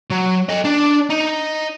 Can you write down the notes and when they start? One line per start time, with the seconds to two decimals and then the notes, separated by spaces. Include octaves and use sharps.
0.10 F#3
0.49 A4 D#5
0.65 D4
1.10 D#4